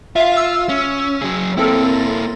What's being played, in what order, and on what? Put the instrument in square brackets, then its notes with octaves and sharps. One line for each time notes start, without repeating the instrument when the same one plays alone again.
[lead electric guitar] F4 [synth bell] E5 F5
[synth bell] E6
[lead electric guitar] C#4
F#3 G#4
[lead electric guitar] A#3 E4 [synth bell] C4 A4 A#4